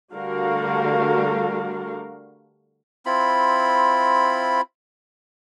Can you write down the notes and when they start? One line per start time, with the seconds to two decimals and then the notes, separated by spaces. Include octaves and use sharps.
0.13 D3 G3 A3 F#4 A#4 F5
3.06 C4 E4 F4 B5